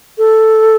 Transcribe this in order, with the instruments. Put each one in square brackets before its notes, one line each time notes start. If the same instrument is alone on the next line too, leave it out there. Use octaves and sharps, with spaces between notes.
[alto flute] A4